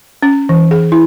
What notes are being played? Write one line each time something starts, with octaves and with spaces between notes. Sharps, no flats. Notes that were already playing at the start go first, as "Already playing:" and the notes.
C#4
E3
G#4
E4